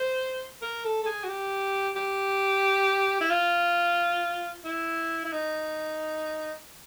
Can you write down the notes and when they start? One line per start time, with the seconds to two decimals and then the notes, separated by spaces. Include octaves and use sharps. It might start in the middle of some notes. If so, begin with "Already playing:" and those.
Already playing: C5
0.62 A#4
0.84 A4
1.03 A4
1.06 G#4
1.24 F#4
1.29 G4
1.96 G4
3.21 E4
3.31 F4
4.65 E4
5.24 E4
5.32 D#4